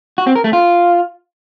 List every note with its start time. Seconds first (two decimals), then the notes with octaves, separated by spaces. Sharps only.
0.18 F#4
0.27 C4
0.36 A#4
0.44 A3
0.53 F4